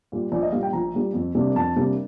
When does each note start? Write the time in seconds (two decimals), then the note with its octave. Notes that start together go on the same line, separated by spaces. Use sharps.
0.12 A#2 G3
0.32 A#1 D5
0.43 D#5
0.52 A#2 G3 F5
0.63 G5
0.73 A#1 A#5
0.94 A#2 G3
1.14 F2
1.35 C3 G3 A#3 D4
1.55 F2 A5
1.76 C3 G3 A#3 D4